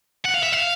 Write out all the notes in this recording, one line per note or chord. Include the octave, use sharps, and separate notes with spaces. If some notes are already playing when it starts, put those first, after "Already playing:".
F#5
F5
E5
F5